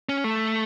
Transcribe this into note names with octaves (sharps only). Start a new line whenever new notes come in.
C#4
A3